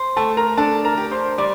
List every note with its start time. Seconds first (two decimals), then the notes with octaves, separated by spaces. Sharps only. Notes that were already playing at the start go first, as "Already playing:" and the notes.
Already playing: C5
0.16 A3 A4 A5
0.37 A#4 A#5
0.57 D4 A4 A5
0.85 A#4 A#5
0.98 G4
1.11 C5 C6
1.38 G3 D5 D6